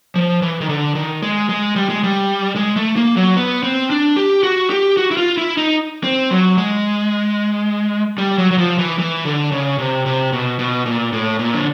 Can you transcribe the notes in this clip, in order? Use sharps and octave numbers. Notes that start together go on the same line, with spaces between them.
F3
E3
D#3
D3
D#3
G#3
G#3
G3
G#3
G3
G#3
A3
A#3
F#3
B3
C4
D4
G4
F#4
G4
F#4
E4
F4
E4
D#4
C4
F#3
G#3
G3
F#3
F#3
F3
E3
E3
D3
C#3
C3
C3
B2
B2
A#2
A2
A#2
D3